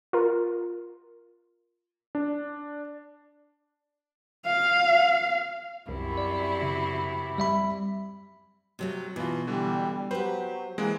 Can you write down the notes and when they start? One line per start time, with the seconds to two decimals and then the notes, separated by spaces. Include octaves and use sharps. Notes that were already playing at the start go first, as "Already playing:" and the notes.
0.13 F4 A#4
2.15 D4
4.46 F5
5.89 C2 F#2 C3 E4
6.18 D5
6.62 C#3
7.38 G3 E5 B5
8.79 C3 F#3 A3
9.16 B2 E3 F4 B4
9.47 D3 E3 G3
10.11 F#3 G4 B4 C5
10.78 E3 G#3 A#3 C4